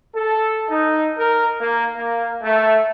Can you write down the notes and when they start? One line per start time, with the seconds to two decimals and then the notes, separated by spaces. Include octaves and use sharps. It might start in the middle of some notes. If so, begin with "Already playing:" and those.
0.15 A4
0.69 D#4
1.18 A#4
1.61 A#3
1.96 A#3
2.43 A3